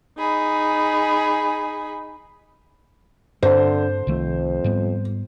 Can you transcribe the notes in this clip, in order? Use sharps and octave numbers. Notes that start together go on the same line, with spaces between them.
D#4 G#4 B5
G2 D3 C4 C5
C2 F2 D#3 A3
G#2 G3 B3